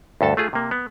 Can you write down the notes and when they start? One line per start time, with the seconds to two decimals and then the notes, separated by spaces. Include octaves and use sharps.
0.21 D2 G2 A4 A5
0.37 A3 F4 G#4
0.53 C3 A#3
0.71 B3